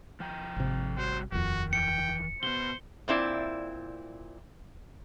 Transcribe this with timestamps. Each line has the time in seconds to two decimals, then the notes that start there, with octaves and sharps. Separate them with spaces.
0.20 F3 G5 A#5
0.56 G#1 C3
0.98 G3 F#4 C5
1.32 D#1 F2 D#3 F#4
1.73 D#3 E3 G5 C#7
2.43 B2 B3 C5 G7
3.08 A#2 C4 E4 D5